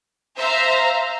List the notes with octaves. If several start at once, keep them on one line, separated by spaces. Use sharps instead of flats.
C5 E5 F5 A#5